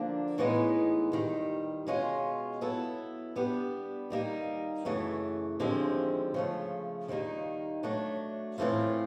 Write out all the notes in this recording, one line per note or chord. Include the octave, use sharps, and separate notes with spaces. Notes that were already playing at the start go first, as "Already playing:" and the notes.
Already playing: D3 F3 A#3 D4
A2 E3 G#3 B3 D#4
D#2 D#3 G3
B2 G#3 C#4 F4
F#3 B3 E4 A4
G3 B3 D4 G4
D#3 G3 A#3 D#4
F#2 C#3 E3 A3
D#2 D3 F3 G#3 C4
C#3 F3 A3
D#2 D#3 G3 A#3 D#4
F#3 A3 D4
A2 E3 A3 C4 F4